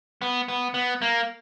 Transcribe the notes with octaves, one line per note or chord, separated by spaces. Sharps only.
B3
B3
B3
A#3